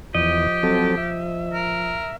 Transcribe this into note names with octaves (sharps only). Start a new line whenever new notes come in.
E2 F3 G4 D#5
F#3 C4 A4
E5
A#4